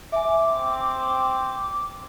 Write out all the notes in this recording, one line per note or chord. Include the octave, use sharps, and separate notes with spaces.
E5 G#5 D6
C4